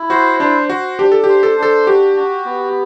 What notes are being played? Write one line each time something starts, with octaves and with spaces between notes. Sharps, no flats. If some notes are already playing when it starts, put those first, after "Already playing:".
Already playing: E4
F#4 C5
D4 C5
F#4 C5
D4 G4
A4
G4 C5
A4
D4 A4
F#4 G4
F#4
B3